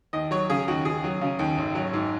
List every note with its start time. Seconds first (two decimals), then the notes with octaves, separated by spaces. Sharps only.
0.13 D#2 D#5
0.31 F#3 C#5
0.50 C#3 G#4
0.68 D#2 F#4
0.85 D#2 G#4
1.04 F#3
1.21 C#3
1.39 D#2
1.58 G#1
1.75 F#3
1.94 G#2